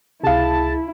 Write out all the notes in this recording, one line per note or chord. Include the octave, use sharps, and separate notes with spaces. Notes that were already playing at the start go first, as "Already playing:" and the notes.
C#2 C3 E4 G#4 F5 A5